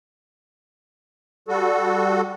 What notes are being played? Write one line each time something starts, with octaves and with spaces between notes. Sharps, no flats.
G3 F#4 A4